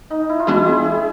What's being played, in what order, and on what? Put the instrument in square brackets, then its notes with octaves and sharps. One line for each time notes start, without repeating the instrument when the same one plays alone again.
[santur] D#4
E4
F4
[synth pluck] E3 G#3 B3 D4 F#4 [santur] E4
[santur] G#4
G#4